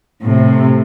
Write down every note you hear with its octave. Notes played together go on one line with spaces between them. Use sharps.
A2 C3